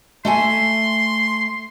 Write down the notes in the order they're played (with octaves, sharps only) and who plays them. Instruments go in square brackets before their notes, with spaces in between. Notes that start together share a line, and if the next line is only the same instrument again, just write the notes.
[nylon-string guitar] A3 E5 G#5 [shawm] C6